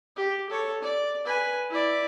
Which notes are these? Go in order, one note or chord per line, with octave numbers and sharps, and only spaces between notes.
G4
A4 C#5
D5
B4 G#5
E4 D5